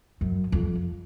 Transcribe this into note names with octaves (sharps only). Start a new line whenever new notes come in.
F#2
F2